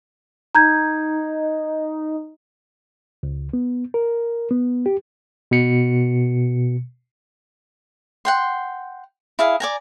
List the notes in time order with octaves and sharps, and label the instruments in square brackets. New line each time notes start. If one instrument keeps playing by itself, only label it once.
[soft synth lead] D#4 [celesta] A#5 G6 G#6
[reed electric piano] C#2
B3
A#4
B3
G4
[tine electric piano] B2 C#7
[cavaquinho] F#5 G5 C6
E4 G#4 F5
D5 G#5 A#5